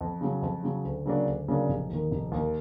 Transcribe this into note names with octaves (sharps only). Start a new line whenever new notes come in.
F2
C#3 F#3
F2
C#3 F#3
D2
C#3 F#3 A#3 D4
D2
C#3 F#3 A#3 D4
F1
D#2 D#3
F1
D#2 D#3